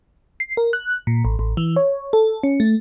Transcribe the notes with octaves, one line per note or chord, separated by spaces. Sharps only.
C7
A#4
F#6
A#2
A1
A1
E3
C#5
A4
C#4
A3